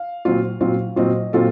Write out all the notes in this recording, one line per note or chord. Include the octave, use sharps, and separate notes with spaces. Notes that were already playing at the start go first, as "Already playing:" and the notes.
Already playing: F5
A#2 F#3 C4 F4
A#2 F#3 C4 F4
A#2 F#3 C4 F4 D#5
A#2 F#3 C4 F4 A4